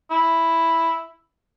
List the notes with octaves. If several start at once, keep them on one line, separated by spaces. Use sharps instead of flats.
E4